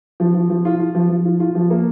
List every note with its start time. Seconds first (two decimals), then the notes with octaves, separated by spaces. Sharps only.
0.20 F3
0.35 F3
0.50 F3
0.65 F4
0.80 F4
0.95 F3
1.10 F3
1.25 F4
1.40 F4
1.55 F3
1.70 A#3